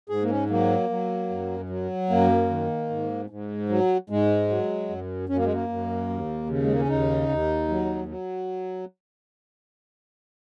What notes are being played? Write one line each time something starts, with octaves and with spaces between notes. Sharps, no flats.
G#2 G#4
A#3
C#4
F#3 A#3
F#3
F#2
F#3
F#2 A#3
D#3
G#2
G#2
F#3
G#2 G#3
F#3
F#2
F#2 C#4
A#3
G#3
A#3
F#2
D#2
C#3
G#3
A#3
C#4
D#2 D#4
D#2
F#3
F#3